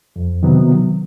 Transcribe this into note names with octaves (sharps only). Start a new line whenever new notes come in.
F2
C3 D#3 F#3 B3